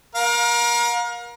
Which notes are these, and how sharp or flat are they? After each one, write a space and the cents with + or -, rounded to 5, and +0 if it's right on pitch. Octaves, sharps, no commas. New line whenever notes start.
A#4 +30 F5 +40